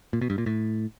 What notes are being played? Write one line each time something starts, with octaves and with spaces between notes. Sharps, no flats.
A#2
B2
G2
A#2
A2